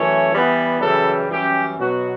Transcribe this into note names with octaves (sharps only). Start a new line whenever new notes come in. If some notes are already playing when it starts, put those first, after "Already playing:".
Already playing: F#2 E3 A3 C#4 C#5
E3 G3 B3 E4
F#2 C#3 E3 G3 A4
F#2 E3 G3 C#4 G4
B2 F#3 B3 F#4